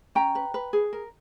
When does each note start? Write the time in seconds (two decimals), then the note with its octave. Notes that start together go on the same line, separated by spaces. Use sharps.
0.15 C#4 G5 A#5
0.35 B4
0.54 B4
0.73 G#4
0.93 A#4